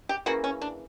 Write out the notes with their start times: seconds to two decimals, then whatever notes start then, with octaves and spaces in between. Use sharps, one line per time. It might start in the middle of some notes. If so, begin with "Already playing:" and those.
0.09 G4
0.26 C#3 E3 A#3 F#4
0.44 C#4
0.62 D4